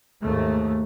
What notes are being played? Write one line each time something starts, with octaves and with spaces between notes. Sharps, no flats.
D#2 G#2 A3